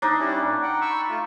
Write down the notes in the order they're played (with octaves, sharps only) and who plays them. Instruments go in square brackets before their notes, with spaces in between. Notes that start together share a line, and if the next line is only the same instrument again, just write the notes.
[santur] D4 D#4
[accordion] G3 C#4 E4
A#2
F#5 G5
B5 C#6 E6
A3 F4